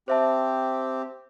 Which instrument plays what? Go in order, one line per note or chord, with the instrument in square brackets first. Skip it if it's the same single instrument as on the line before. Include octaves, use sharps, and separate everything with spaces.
[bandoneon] C4 G4 [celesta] C5 E5 A5